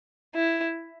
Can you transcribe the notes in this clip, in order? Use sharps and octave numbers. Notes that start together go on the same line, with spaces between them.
E4